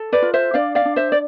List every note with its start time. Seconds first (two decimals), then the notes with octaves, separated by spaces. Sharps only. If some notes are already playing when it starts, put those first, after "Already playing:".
Already playing: A4
0.12 B4 D5
0.22 F4
0.34 C5 E5
0.54 D4 D5 F5
0.75 D5 F5
0.85 D4
0.96 C5 E5
1.12 D5